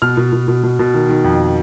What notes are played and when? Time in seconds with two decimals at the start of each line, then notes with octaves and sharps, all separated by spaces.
0.02 B2 F6
0.17 B2
0.33 B2
0.48 B2
0.64 B2
0.79 B2
0.94 D#3
1.09 D#3
1.24 F2